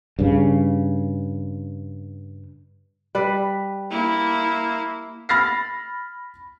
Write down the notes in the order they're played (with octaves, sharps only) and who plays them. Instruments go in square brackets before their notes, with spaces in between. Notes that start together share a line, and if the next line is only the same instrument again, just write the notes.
[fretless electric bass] G2 C#3
[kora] G3 B4
[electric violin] A#3 E4
[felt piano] B5 F6 A6 A#6 C7